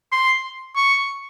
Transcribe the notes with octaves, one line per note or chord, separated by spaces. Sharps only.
C6
C#6